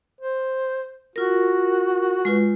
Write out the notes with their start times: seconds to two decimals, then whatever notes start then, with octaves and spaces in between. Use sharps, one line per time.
0.21 C5
1.16 F4 F#4 A#4
2.25 G#3 F4 B4